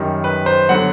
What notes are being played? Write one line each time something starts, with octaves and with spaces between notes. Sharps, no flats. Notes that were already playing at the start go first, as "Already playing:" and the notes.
Already playing: F#2 D#3 G3
B4
C5
D3 F#3 B3 F#5